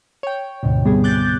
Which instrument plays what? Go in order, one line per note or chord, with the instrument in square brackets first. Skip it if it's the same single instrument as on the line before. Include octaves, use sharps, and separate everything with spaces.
[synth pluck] C#5 G5
D2 G#2 B2 D3
C3 G3 B3 G#4
D6 F#6 G6 A6